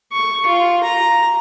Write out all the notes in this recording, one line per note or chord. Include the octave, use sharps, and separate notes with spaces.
C#6
F4
A#5